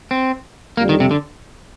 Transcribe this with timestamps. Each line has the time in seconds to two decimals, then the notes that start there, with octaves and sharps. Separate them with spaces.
0.11 C4
0.77 F2 D3 G3 A#3
0.89 D#3
1.00 C3
1.11 D3